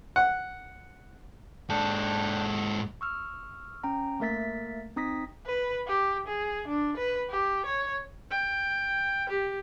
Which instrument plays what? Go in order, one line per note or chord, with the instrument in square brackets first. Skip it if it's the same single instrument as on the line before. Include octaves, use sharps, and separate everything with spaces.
[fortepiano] F#5
[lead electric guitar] G#2 A4 [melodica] D4 G5
[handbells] C#6 E6 F6
C#4 G5 A#5
A3 A#3 A#4 E5 A6 B6
C4 D#4 D#6 A#6 B6
[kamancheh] B4
G4
G#4
D4
B4
G4
C#5
[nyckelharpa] G5
G4